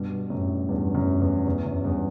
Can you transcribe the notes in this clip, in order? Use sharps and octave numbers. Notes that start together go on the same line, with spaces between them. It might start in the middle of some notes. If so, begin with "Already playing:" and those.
Already playing: G2 B2
F#2 A2
E2 G2
F#2
E2
E2
F#2
E2 G2